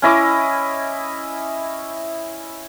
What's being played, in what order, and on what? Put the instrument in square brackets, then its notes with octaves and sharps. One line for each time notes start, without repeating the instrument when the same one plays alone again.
[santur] C#4 E4 D#5 D6